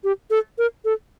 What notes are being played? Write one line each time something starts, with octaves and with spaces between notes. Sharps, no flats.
G4
A4
A#4
A4